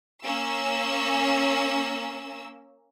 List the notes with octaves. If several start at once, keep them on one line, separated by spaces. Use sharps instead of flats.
A#3 C#4 E6